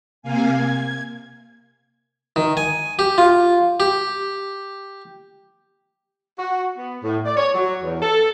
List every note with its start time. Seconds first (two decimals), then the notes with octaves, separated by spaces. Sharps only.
0.22 C3 A#3 F5 G#5
0.53 G#6
2.36 D#3
2.57 G#5
2.99 G4
3.18 F4
3.80 G4
6.39 F#4
6.78 B3
7.04 A2
7.25 D5
7.37 C#5
7.55 F#3
7.83 E2
8.02 A4